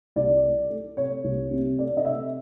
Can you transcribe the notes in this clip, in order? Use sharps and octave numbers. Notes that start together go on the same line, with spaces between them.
C2 D5
A3
A3
C3 C#5
C2
C3
A3 D5
D#5
C3 E5